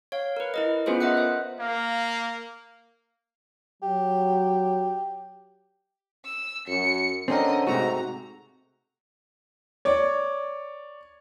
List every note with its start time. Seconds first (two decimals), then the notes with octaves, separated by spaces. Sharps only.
0.12 C#5 F5
0.37 A#4 B4
0.54 E4 A#4 D#5
0.86 B3 C#4 F4 G#4 B4 C5
1.00 A#4 D#5 E5 F#5 F#6
1.17 C5
1.60 A#3 F5
3.82 F#3 G4
6.25 E6
6.67 F#2 C#7
7.28 D3 C4 C#4 A#4 D#5
7.67 G#2 C3 A3 F#4 A#5
9.85 C#5 D5